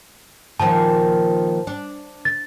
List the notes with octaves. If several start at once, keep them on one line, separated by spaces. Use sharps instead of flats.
A#2 D#3 F3 A5
D4
A6